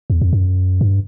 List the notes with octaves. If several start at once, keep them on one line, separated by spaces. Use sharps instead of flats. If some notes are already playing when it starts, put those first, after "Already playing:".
E2
F2
F#2
G2